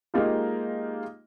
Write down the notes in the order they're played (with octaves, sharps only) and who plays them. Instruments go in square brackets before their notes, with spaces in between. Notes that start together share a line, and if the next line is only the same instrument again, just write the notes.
[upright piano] G#3 A#3 D#4 F4 G4